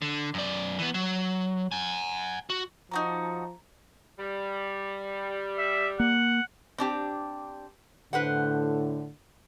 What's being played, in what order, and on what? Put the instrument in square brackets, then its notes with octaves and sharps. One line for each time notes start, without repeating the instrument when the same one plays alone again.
[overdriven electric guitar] D3
F#2 D5
E3 B3
F#3
F#5 G#5
F#4
[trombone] F3 [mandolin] D#4 F#4 D5 [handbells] A5 A#5
[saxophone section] G3
[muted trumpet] E5
[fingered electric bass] A#3 [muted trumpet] F#5
[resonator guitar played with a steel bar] C4 D4 G4
[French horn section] A2 D3 [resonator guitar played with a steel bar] B4 C5 F#5